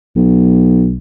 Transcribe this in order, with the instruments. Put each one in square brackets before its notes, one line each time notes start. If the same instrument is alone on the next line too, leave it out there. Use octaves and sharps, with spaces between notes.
[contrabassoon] B1